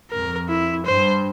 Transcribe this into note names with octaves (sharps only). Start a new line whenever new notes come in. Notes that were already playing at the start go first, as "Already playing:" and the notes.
F2 A#4
E4
G2 C5